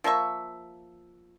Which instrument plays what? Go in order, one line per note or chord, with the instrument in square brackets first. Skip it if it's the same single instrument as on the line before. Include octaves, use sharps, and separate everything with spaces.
[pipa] F3 A#3 E5 C#6